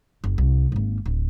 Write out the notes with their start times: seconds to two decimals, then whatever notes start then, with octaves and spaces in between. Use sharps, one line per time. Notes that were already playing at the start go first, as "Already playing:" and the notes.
0.24 F#1
0.38 C2
0.72 G#1 A#3
1.06 D1